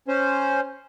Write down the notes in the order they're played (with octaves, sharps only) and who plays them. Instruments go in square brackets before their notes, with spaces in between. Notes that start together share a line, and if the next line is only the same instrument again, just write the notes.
[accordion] C#4 C5